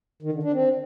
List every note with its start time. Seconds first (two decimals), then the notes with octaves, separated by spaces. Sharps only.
0.23 D#3
0.33 D3
0.43 D4
0.53 C4